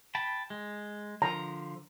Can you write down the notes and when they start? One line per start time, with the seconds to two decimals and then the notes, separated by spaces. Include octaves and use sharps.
0.15 G5 A5 B5
0.50 G#3
1.22 D3 F3 A#5